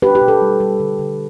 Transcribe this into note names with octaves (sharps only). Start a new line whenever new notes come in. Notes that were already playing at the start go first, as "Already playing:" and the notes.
D4 G4 B4
G4
B2
A4
G3
G3
D3
D3